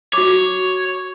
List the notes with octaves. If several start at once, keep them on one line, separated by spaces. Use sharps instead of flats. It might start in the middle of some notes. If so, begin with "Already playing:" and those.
F#4 C#5 D6